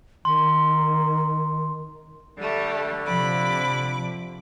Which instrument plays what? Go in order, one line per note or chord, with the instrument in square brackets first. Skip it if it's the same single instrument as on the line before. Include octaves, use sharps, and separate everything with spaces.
[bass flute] D#3 [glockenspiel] C6
[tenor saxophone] D3 [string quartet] G3 A3
[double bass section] C3 F3 [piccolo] B5 [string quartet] D6